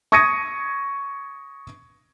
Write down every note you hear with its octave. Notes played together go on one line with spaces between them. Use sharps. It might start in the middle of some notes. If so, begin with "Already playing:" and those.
C#6 D#6 G#6 A#6 C#7 D#7